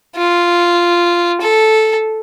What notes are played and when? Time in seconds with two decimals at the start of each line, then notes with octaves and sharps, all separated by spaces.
0.17 F4
1.41 A4